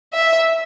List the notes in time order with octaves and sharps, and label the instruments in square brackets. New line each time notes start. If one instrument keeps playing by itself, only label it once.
[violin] E5